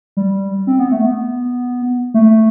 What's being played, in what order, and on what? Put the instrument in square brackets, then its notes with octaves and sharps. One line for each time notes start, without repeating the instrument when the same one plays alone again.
[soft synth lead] G3
C4
B3
A3
B3
A3